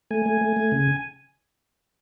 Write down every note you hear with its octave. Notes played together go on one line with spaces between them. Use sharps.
A3 G#5
A3
A3
A3
C#3